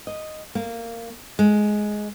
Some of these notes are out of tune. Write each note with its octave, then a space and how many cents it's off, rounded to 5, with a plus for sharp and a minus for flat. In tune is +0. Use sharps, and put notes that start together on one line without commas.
D#5 -5
A#3 -15
G#3 +10